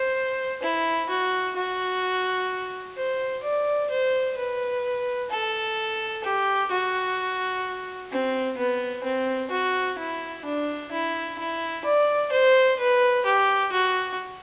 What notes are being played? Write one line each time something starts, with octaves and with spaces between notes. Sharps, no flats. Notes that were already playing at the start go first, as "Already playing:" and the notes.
Already playing: C5
E4
F#4
F#4
C5
D5
C5
B4
A4
G4
F#4
C4
B3
C4
F#4
E4
D4
E4
E4
D5
C5
B4
G4
F#4